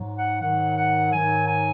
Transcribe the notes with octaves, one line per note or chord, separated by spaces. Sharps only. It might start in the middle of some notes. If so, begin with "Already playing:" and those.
Already playing: G#2 F#3
F#5
G#2 D#3 F#3 F#5
F#5
G#2 D#3 F#3 G#5
G#5